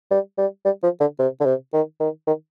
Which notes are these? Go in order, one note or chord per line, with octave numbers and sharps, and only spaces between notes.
G3
G3
G3
F3
D3
C3
D3
C3
D#3
D#3
D#3